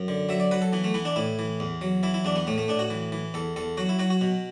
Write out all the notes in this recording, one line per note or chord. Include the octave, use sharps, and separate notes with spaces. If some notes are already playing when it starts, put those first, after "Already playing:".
Already playing: F#2
D3
F#3 E5
D5
F#3 B4
A4
E3 B3
A3
E3 B3
D4
A2 E4
E3
E2
F#3
E3 E4
E4
E2 D4
B3
A2 A3
A3
A2 D4
F#4
E3
E3
E2 A4
E2 A4
F#3 F#4
E4
F#3 F#4
F#4
B2